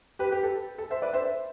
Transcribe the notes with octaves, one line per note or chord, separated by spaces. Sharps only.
G4 B4
G4
A4
A4
C5 E5
B4 D5
C5 E5